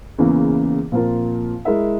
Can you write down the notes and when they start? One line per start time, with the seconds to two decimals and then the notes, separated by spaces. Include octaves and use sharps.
0.18 E2 C#3 E3 A#3
0.92 A#2 F3 C4 F4 A#4
1.65 G#3 E4 A#4 E5